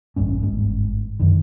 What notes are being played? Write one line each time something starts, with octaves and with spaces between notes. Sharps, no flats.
D1 A1 G2 C#4
G1 G#2
F#2 D3 D#3